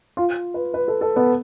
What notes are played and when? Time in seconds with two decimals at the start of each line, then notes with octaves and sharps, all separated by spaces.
0.17 F4
0.54 B4
0.74 B4
0.88 A4
1.01 A4
1.16 B3